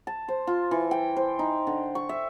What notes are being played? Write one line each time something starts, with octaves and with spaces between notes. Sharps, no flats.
A5
C5
F4
E3
G5
C5
D#4
D3
C#6
E5